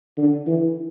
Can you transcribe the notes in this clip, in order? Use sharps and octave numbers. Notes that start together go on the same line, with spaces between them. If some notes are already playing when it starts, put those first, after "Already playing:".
D3
E3